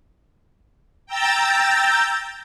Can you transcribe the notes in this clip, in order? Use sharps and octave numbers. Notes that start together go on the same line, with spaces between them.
G5 A#5 E6 G6 A6